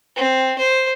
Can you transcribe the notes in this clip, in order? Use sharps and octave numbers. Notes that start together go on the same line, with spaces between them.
C4
C5